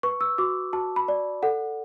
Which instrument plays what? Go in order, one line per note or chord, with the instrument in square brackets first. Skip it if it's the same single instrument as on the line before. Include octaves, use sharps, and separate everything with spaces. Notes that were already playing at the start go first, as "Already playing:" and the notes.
[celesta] B4 C#6
E6
F#4 D6
F#4 A5
B5
D5
A4 F#5